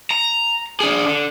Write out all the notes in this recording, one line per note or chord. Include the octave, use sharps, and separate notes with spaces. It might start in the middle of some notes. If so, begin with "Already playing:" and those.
A#5
D4 G#4
D3